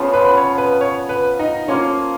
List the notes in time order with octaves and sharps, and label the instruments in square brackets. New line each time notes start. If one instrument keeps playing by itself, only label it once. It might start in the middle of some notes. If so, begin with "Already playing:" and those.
Already playing: [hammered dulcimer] C#3 F3 B3 F4
[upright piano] B4
C#5
B4
C#5
B4
D#4
[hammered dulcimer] F3 A#3 F4 [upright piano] C#4